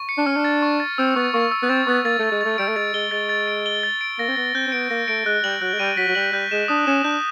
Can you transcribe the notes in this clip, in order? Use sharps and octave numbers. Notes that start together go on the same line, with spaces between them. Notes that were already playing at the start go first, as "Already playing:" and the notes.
Already playing: C#6
C#7
D4
C#4 F6
D4
A6
C#6
A6
C4 E6
B3 C#6
A#3 C#6
E6
B3
C4 A6
B3 C#6
A#3 A6
A3 A6
G#3
A3 A6
G3 D7
A3
G#3 A6
G#3 G7
G#3 A6
A6
D7
G7
A6
D7
A#3 A#6
C4
B3 A#6
C4 G6
C4
B3 D7
A#3 A#6
A3 D7
G#3 F#6
G3 F#7
F#3 F#6
G#3
G3 D#7
F#3 B6
F#3
G3 F#7
G3 G6
G#3 E7
D4 D#6
C#4 E7
D4 G6